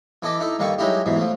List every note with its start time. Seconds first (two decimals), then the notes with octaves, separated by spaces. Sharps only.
0.22 E3 E4 A4 D#5 D6
0.40 D#4 E4 A4
0.59 G2 D#3 A#3 A4 C#6
0.79 F#3 G#3 D#4 E4 G4
1.06 G#2 B2 E3
1.17 F3 A3